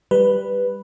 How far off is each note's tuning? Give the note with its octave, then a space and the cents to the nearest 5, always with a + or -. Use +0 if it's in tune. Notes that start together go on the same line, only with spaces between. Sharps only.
G3 +0 B4 +0